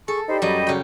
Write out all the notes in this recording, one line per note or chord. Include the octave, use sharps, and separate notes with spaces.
G#4 A4 A5 C#6
D#4 G4 C5 D5 B5
F#2 F#3 G3 D#5
C#3 F#3 G5